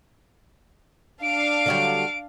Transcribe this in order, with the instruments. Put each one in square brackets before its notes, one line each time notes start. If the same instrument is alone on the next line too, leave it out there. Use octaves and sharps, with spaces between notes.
[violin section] D4 F5 [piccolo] D7
[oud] D3 F#3 G3